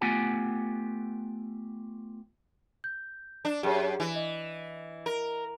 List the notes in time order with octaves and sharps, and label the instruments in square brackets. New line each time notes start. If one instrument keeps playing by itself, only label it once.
[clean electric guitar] A3 B3 F4 G4 F#5 G#5
[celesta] G6
[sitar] D4
[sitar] F#2 [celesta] G4 G#4 C#5
[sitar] E3
[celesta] D#5
[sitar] A#4